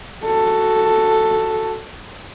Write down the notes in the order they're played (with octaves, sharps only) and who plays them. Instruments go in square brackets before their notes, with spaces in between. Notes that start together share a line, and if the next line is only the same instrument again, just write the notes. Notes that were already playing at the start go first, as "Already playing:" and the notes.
[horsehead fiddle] F#4 A4